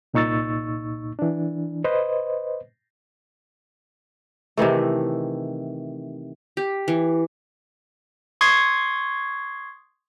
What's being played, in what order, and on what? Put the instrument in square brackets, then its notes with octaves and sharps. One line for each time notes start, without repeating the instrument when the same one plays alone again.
[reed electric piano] C2 A#2 D#4 C#6 E6 A6
E3 D4
B4 C5 D#5
[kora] C3 D#3 E3 A3
[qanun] G4
E3
[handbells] C6 C#6 D#6 G#6 C7